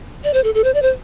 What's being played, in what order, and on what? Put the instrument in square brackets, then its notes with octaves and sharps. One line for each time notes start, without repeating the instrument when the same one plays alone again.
[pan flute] D5
C5
A4
A4
C5
D5
C5